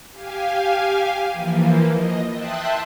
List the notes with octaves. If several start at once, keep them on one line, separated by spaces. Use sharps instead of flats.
G4 F5 G#5
E3 F3 A#3
D#5
E5 G5 A5 C6 D#6 F#6